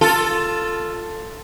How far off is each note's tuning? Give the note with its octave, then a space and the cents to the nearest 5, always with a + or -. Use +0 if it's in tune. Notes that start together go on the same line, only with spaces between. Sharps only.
F4 +0 A4 +10